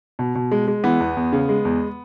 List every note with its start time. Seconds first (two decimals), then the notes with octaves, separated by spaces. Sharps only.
0.19 B2
0.35 B2
0.51 G#3
0.68 G#3
0.84 E3 B3
1.00 E2
1.17 E2
1.33 C#3
1.49 G#3
1.65 E2